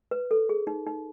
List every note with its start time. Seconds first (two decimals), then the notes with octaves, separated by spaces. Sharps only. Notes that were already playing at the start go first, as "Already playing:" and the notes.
0.11 B4
0.31 A4
0.49 G#4
0.67 D#4
0.87 D#4